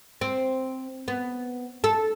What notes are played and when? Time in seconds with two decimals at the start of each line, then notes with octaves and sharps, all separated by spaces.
0.21 C4
1.08 B3
1.84 A4